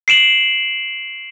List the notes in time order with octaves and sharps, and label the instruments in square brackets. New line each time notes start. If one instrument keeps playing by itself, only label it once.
[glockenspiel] C7 D7 E7 F#7